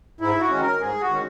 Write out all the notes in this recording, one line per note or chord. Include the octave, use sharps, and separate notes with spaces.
G#2 E4
F#4
D#3 G#3 C#4
A#4
G#2 G#4
F#4
D#3 G#3 C#4